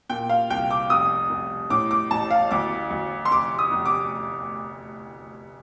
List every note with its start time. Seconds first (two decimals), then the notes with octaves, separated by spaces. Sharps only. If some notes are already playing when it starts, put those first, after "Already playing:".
0.10 A#2 G5
0.29 F5
0.50 C2 G5
0.70 D6
0.90 F1 D#6
1.30 F1
1.70 A2 D6
1.91 D6
2.11 A1 A5
2.31 F5
2.51 D2 D6
2.90 D2
3.25 C6
3.31 F1 D6
3.59 D#6
3.72 F1
3.85 D6